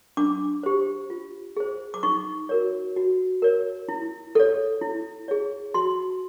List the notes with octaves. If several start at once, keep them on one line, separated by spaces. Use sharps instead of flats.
D4 D6
G4 C5
F4
G#4 C5
D6
D#4 C#6
F#4 A#4 C#5
F#4
A#4 C#5
E4
A4 C#5
E4
G#4 C#5
F#4 C6